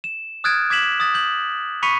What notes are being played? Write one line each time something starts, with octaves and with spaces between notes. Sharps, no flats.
E7
D#6 F6 F#6 G#6 A6 D7
D6 G#6 B6 E7 F#7
D#6 A6
G6 F#7
B5 C#6 B6 C#7 D#7 F7